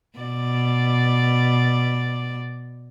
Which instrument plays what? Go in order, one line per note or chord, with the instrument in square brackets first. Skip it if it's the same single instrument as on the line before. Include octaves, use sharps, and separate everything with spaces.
[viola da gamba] B2 D5